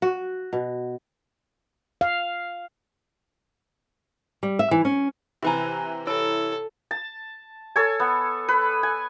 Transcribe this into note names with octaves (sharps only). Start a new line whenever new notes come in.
F#4
B2
F5
G3
E5
E3
C#4
C3 E3 E4 B4 G#5 A#5
E4 A4 C#5 E6
A5
A4 C#5 G#5
B3
B4
G#5